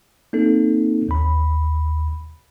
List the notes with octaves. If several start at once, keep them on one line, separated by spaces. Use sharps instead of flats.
A#3 C4 D#4 A4
D#2 B5